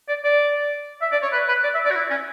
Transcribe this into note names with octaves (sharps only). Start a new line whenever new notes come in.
D5
D5
E5
D5
C#5
B4
B4
D5
E5
D5
F#4
E4
C#4